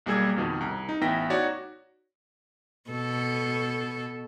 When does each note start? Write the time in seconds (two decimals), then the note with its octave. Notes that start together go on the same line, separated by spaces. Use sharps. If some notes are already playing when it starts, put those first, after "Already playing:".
0.06 B1 G3 A#3 G#4 E6 G#6
0.36 F2 B2 D#3
0.61 C2 A#5
0.89 D#4
1.01 A1 B3 E4 G5 A#6 B6
1.30 D#4 F#4 C#5 D5
2.90 B2 A4